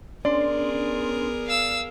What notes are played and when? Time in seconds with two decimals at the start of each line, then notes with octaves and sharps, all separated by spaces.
0.25 B3 C#4 D4 G#4 A#4 D5 C6
1.47 F5 E6